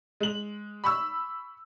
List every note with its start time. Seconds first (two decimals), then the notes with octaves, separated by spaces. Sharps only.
0.20 G#3 F#7
0.84 B5 C#6 E6